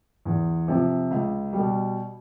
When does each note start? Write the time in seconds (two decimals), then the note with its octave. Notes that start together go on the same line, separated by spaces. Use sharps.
0.25 E2
0.68 C3 F3
1.11 C#2
1.53 B2 G3